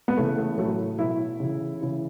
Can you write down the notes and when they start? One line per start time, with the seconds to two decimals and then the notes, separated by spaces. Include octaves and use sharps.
0.08 B3
0.17 C#3 E3 A3
0.38 A3
0.58 A2 F#3 A3
0.99 B2 F#3 E4
1.40 C#3 E3
1.81 C#3 E3